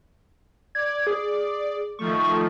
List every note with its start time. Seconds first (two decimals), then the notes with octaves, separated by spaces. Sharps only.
0.75 D5 G#6
1.07 G#4
1.99 D#3 F3 A3 C#6